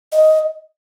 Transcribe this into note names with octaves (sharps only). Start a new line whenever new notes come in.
D#5